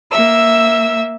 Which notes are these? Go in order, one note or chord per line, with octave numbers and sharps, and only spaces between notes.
A#3 E5 E6